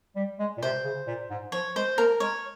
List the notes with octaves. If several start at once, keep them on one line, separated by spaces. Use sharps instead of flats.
G3
G#3
A#2
C3 C5
C#3
A#2
G#2
F3 C#5
G#3 C5
A#3 A#4
G#3 C#5